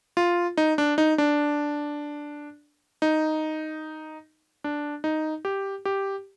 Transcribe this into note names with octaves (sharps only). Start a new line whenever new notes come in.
F4
D#4
D4
D#4
D4
D#4
D4
D#4
G4
G4